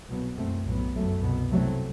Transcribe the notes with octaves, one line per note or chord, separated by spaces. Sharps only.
C2 B2 F#3 B3
F#2 E3 A3 C4
B1 A2 F#3 B3
G1 F#2 F#3 A3
C2 B2 F#3 B3
C2 C3 F#3 A3 C4